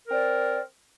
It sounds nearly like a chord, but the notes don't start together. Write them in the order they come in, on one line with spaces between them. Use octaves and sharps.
A#4 C4 D5